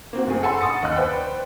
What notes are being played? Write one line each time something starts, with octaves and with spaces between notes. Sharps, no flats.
A#3 C4 F#4
F#1 A3 G#4
C#4 A4 F#5 G#5 B5 C6
F#5 C#6 D#6 A6 C#7
D#2 D#5 F#6
B4 C5 D5 G5